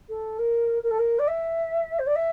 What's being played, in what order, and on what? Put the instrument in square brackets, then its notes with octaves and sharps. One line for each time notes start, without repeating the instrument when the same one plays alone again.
[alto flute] A4
A#4
A#4
A4
A#4
D5
E5
C5
D5
E5